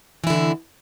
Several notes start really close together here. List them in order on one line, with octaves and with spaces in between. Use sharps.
E3 E4 D3 B2